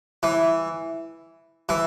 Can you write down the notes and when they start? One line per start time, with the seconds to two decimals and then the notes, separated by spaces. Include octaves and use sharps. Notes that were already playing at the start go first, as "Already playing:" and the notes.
0.23 E3
1.69 E3